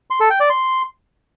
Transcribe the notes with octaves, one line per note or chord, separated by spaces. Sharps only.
C6
A4
G5
D5
C6